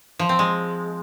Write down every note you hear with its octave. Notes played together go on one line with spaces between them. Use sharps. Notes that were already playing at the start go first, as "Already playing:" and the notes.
F3
C4
G#3